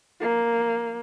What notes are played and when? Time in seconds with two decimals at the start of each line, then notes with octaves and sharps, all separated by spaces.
0.21 A#3